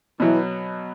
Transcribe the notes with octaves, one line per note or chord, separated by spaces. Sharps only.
B2 E3 F#3 B3